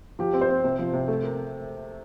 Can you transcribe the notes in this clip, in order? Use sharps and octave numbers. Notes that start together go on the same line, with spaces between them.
F3 G4
C4
C5
C4
C3
F3
C3
A3
A#4